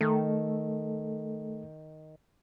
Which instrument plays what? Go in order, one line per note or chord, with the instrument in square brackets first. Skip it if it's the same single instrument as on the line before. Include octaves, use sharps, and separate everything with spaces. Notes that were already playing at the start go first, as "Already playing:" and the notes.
[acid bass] D#3 [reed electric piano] A3 A4